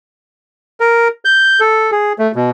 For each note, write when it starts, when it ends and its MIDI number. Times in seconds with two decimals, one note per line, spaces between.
0.80 1.08 70
1.25 1.60 91
1.60 1.91 69
1.92 2.13 68
2.19 2.32 57
2.36 2.50 47